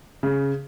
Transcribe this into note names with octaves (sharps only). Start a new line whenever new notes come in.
C#3